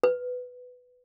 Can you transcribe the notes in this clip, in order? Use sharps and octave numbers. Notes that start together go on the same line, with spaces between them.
B4